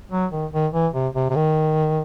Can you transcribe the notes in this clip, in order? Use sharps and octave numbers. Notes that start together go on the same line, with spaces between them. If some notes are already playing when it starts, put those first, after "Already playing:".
F#3
D#3
D#3
E3
C3
C3
C3
D#3